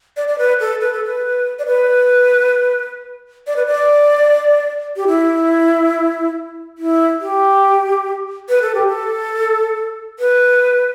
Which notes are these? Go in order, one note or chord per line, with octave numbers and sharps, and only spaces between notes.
D5
D5
B4
A4
B4
A4
B4
D5
B4
D5
B4
D5
G4
E4
E4
G4
B4
A4
G4
A4
B4